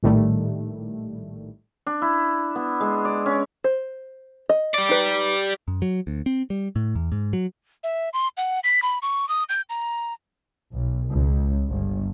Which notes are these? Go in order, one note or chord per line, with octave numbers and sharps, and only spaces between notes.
A#1 A2 D#3 G3 A3
D4
E4
B3
G#3
D5
C#4
C5
D#5
G4 D5
D#4 B4
F#2
F#3
D2
C4
G3
A2
E2
G#2
F#3
E5
C6
F#5
B6
B5
C#6
D#6
G6
A#5
B1
C#2
G1